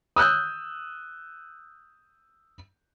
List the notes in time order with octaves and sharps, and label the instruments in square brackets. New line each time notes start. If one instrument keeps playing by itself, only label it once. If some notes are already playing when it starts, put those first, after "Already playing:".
[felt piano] D#6 E6 F#6 G6